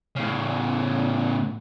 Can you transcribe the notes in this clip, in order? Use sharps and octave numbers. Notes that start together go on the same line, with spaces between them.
A2 C#3